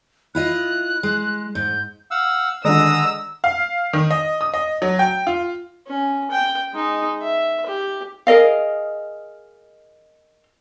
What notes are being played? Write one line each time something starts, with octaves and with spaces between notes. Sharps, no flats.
E4 F4 D#5 F#6
G#3
G#2 G6
F5 F#5 E6
D3 D#3 G#3 A#5 D#6 E6
F5
D#3
D#5
D#6
D#5
F#3
G5
F4
C#4
G5
G#3 D#4
E5
G4
G#4 A#4 D#5 F5